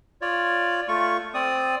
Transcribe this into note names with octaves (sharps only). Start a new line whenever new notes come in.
F4 C#5 D5
A3 F4 C#6
C4 D5 D#6